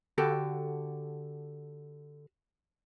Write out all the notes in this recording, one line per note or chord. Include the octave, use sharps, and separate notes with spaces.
D3 F#4 G4 A4